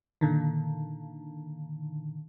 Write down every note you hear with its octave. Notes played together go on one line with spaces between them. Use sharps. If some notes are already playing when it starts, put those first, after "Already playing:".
A#2 D3 D#3